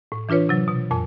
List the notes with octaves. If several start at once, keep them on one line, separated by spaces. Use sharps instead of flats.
A2
E3 D4 F4 B4 C#5
C3 F#3
B2
F2 A#2 G#5